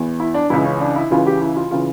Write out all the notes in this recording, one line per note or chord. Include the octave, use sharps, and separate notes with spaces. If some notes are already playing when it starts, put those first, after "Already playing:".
Already playing: E2 E3
E4
D4
C#2 C#3 E3 E4
C#4
D4
E4
C#2 C#3 E3 F4
G4
E4
F4
C#3 E3 F4